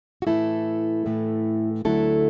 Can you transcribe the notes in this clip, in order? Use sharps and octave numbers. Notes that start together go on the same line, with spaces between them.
F#4
A2 E3 A3 E4 A4
A2 E3 A3
D2 D3 F#3 A3 E4 A4